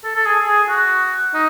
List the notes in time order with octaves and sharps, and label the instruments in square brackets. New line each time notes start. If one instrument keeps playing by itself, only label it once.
[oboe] A4
A4
G#4
G#4
F#4
D#4